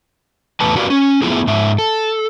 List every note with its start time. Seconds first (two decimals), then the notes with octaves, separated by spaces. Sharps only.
0.60 E2 A2 A3 B4 A5
0.76 F#4 G4 A#4 B4 D5 F5
0.90 C#4
1.22 A3 B3 E4 F4 G#4
1.47 G#2 E5
1.79 A4